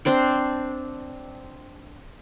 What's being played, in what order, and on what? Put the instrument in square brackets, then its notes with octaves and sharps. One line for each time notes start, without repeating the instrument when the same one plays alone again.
[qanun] C4 D4 C5 G5